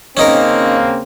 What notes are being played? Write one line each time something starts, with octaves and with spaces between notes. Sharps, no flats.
C#3 A#3 C4 C#4 D#4 A#4